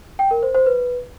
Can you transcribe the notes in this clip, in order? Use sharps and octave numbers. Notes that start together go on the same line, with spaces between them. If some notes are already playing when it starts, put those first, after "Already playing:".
G5
A#4
C5
C5
B4